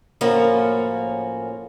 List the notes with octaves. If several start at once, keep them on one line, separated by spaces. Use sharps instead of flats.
A2 F3 A#3 C#4 F#4